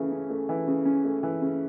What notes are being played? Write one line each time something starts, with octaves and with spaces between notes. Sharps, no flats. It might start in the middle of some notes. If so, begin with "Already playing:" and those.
Already playing: C#3 E3 A3
C#4
A3
E3
C#3
C#4
A3
E3
C#3